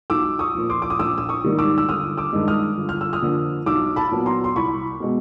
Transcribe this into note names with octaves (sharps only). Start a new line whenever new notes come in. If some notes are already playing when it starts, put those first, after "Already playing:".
B1 D6 E6
C#6 D#6
A#2 F3
C6 D6
D6
D#6
A#1 D6 E6
E6
C#6 D#6
G#2 D#3 G3 A#3
D6 E6
E6
G1 D#6 F6
D6 E6
G2 D#3 G#3
D#6 F6
G1
F6
E6
D#6 F6
F2 D3 F3 A#3
B1 D6 E6
A5 B5
A#2 F#3 B3
A#5 C6
C6
C2 B5 C#6
B2 G#3 B3